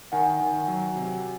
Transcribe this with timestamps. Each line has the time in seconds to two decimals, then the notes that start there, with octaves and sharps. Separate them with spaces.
0.12 D#3 F#5 G#5
0.40 D#3
0.68 F#3
0.96 C3